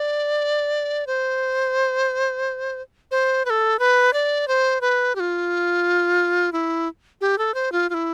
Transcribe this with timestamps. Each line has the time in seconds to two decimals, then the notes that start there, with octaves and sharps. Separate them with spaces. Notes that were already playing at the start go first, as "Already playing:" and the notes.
Already playing: D5
1.07 C5
3.11 C5
3.45 B4
3.50 A4
3.79 B4
4.13 D5
4.48 C5
4.81 B4
5.15 G4
5.20 F4
6.52 E4
7.21 G4
7.38 A4
7.54 C5
7.72 F4
7.90 F4
7.94 E4